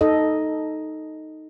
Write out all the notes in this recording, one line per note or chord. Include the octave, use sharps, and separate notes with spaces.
D#4 A4 D#5